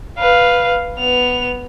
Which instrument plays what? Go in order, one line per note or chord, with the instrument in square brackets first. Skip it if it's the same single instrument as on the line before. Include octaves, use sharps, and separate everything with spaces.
[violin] B4 F5
B3 F7